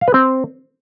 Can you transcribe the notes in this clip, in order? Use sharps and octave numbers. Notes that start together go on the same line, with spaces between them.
F5
B4
C4